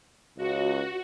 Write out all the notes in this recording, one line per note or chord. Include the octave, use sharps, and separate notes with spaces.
C#2 F#4